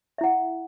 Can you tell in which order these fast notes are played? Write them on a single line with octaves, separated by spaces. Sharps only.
E5 E4 F#5